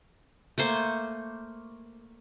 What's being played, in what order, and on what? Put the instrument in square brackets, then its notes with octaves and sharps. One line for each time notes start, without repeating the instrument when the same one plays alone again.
[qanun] A3 A#3 C5 G#5